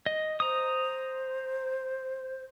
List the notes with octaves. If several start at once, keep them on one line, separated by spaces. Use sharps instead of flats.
D#5
C5 A#5 D#6